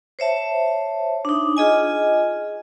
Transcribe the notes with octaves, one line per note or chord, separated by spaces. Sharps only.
C5 C#5 E5 A5
D4 D#4
F4 G#4 D#5 G#5